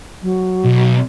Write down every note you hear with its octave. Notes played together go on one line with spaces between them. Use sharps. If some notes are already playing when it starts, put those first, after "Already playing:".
F#3
B1